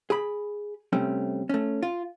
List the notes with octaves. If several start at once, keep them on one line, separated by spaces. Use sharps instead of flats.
G#4 B5
C3 G3 A3 C4 C#4
A3 C#4
F4